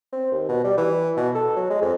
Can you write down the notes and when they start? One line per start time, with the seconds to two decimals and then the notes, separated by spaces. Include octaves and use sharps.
0.13 C4
0.32 D#2
0.49 B2
0.64 G3
0.77 E3
1.17 B2
1.35 A4
1.56 F#3
1.70 G#3
1.81 F2